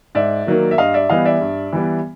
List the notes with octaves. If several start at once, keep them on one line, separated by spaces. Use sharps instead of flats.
G#2 D5 E5
D#3 F#3 A#3
E5
G2 D#5 F5
D5 E5
E3 G3 B3 D#5 F5
D5 E5
G2
E3 G3 B3